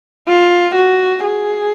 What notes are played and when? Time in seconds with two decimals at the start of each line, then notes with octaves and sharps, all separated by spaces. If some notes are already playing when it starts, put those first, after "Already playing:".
0.28 F4
0.76 F#4
1.23 G#4